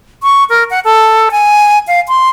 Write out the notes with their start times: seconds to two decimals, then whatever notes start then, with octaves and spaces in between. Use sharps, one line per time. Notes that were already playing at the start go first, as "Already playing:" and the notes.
0.23 C#6
0.50 A#4
0.70 F#5
0.85 A4
1.31 G#5
1.87 F5
2.08 C6